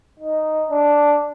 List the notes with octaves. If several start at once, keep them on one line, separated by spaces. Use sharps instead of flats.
D#4
D4